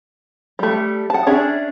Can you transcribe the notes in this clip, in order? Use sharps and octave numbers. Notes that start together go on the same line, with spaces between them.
G3 A3
F#5 A5
C#4 D4 G#4 E5